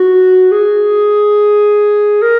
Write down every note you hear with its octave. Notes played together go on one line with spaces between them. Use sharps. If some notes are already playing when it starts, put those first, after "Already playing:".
Already playing: F#4
G#4
A#4